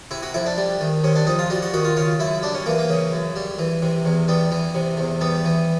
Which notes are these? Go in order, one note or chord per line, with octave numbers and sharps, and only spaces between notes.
C3 E4
F#4
F2 E4
D4
G3
D#3
C3 C#4
D4
F2 D#4
F4
G3 F#4
F#4
D#3 F#4
F4
C#3 F4
F#2 E4
G3 D4
C#4
E3 A#3
A#3
C#3
F#2
G3
E3
C3
E2
G3 B3
E3
C3
E2
G3 B3
E3